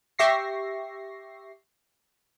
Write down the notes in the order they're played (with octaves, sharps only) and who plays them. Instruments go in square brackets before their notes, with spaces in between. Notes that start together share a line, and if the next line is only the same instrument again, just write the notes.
[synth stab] G4 E5 C#6 A#6 C7